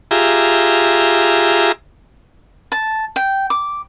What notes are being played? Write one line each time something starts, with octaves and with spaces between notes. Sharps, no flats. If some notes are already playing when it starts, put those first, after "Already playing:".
F4 G4 G#4 E5 A#5
A5
G5
D6